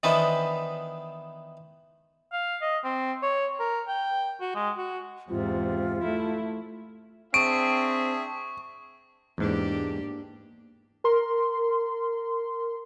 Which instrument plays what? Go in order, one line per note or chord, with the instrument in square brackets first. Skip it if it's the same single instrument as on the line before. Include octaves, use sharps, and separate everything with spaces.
[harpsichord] D#3 E3 B3 D4 B4 C5
[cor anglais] F5
D#5
C4
C#5
A#4
G5
F#4
G#3
F#4
[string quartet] E2 G#2 C3 [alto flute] F4
[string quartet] A3 E4
[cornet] C4 [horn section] D4 G#4 E5 [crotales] C#6 [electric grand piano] D7
[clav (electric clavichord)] E2 G#2 [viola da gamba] A#3 D4 G4
[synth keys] A#4 C6